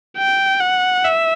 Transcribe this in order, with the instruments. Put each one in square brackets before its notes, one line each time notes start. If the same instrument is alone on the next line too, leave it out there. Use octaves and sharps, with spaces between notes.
[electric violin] G5
F#5
E5